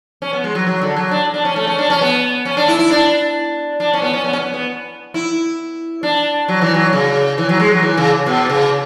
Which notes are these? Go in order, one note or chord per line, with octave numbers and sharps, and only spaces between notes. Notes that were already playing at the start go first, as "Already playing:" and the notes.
C#4
B3
G#3
F#3
F#3
D3
F#3
D4
D4
C#4
A3
C#4
D4
C#4
B3
C#4
D4
E4
E4
D4
D4
C#4
B3
C#4
B3
C#4
B3
B3
E4
D4
F#3
E3
F#3
C#3
E3
F#3
G#3
F#3
E3
C#3
B2
C#3